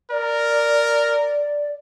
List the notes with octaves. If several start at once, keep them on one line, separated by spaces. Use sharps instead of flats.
A#4 D5